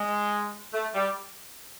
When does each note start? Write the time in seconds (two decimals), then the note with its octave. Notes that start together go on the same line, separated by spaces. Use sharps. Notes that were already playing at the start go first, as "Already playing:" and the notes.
Already playing: G#3
0.73 A3
0.93 G3